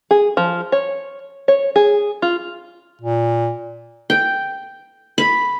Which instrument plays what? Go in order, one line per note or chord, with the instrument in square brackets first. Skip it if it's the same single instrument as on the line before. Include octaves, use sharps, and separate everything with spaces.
[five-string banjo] G#4
F3
C#5
C#5
G#4
F4
[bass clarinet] A#2
[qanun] G5
B5